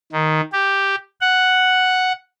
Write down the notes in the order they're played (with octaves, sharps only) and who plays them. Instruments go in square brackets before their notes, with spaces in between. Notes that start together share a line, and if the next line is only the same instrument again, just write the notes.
[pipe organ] D#3
G4
F#5